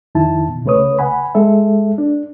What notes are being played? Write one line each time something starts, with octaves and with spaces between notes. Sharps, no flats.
F2 D#3 E4 A5
B2
C#2 C#3 A3 B4 C#5 D#6
F#5 G#5 B5
G#3 A4 E5
D4